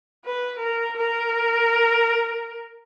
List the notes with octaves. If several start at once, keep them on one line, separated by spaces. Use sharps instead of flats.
B4
A#4
A#4